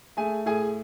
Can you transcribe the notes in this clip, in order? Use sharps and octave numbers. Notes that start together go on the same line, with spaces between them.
A3 G#4 G#5
A2 G#4 G#5